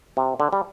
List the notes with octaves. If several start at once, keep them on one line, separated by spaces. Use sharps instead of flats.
C3
D3
G3